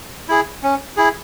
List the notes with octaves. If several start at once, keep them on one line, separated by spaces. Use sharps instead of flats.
E4 G#4
C#4
E4 G#4